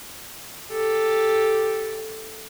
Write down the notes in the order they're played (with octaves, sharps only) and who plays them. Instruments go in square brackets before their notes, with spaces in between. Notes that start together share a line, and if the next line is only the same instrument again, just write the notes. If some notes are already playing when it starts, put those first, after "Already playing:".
[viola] G4 A4